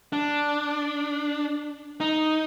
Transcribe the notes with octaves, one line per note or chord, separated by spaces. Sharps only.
D4
D#4